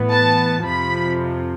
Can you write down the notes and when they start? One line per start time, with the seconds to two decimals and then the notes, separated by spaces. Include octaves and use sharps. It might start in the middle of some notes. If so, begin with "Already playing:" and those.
Already playing: A2 E3 B3
0.10 A5
0.65 F2 C3 F3 B5